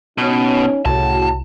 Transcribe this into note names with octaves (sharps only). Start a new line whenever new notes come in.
B2 C#4 D#4
C2 A2 C#3 F#4 A5